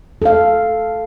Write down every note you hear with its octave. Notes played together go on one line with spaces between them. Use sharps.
A4 F5